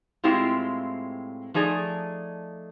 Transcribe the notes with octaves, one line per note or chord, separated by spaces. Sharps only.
A2 G#3 C4 E4 F4 G4
F3 A3 D#4 G#4 D5